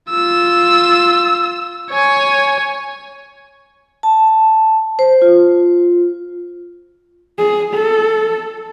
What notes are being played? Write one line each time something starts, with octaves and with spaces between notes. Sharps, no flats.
F4 E6
C#5 G#5
A5
C5
F4
G#4
A4